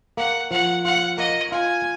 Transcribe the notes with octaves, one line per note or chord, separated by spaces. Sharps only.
A#3 F#5
F3 F#5
F4 F#5
A#3 D#5
F4 G#5